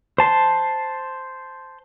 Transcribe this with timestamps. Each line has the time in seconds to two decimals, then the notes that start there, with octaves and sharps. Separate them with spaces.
0.18 C5 A5 C6